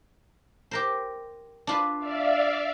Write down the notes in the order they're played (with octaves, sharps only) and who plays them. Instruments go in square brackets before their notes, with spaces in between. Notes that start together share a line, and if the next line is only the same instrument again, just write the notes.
[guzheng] G4 A#4 C5
D4 F4 B4
[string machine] D5 E5 F5